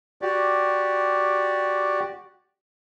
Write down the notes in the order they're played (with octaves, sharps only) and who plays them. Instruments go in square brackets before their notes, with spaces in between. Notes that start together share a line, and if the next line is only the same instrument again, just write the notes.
[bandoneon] F#4 G4 D5